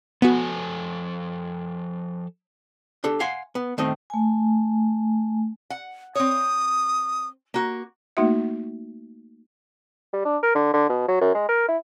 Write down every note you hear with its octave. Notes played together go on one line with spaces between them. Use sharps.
F3 B3 F#4 A4 G#5
D4 G4 A4
F5 F#5 G#5 C6
B3
D#3 A3 C4 D#5
A3 G#5
F#5
C4 C#5 D#6
A#3 F#4
A3 A#3 D#4 F#4 E5
G3
D4
A#4
D3
D3
B2
F#3
F#2
G#3
A#4
E4